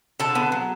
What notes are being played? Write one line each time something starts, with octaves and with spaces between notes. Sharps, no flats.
D3 A5
B3
F#3